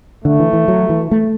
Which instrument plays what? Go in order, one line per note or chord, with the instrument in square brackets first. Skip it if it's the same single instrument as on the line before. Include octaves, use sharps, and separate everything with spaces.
[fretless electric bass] D3 [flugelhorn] A3
[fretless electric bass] E3
E3
F#3
E3
A3